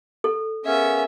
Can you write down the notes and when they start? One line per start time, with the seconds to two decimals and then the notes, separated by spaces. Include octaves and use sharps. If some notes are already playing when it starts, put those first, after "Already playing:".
0.24 A4
0.65 B3 C#4 G#4 A#4 E5 F5